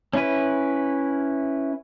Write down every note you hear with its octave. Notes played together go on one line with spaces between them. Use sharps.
C#4 E4 B4